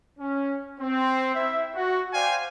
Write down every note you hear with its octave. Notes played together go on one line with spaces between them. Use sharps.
C#4
C4
E4 E5
F#4
C5 D5 F5 G5 G#5